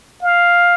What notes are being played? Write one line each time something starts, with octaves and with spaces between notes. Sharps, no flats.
F5